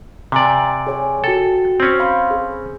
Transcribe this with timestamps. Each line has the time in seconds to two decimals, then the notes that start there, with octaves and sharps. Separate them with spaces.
0.32 C3 D5 G5 G#5 A#5
0.87 G#4 C#5 G#5
1.24 F#4 A4 G5
1.80 C4 C#4
2.00 F5 B5 C6
2.31 G#4